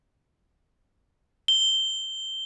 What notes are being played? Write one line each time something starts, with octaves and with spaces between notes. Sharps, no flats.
G7